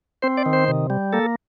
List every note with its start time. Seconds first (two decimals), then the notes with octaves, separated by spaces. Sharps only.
0.22 C4 C5
0.37 D5
0.46 D#3
0.53 C5
0.68 C3
0.90 G3
1.13 A#3 A4